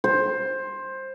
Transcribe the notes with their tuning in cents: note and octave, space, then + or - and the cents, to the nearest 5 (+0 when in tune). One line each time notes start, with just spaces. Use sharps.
C5 +15